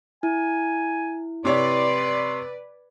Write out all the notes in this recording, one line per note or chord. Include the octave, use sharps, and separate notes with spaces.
E4 G#5
C3 B4 C#5 D5 C6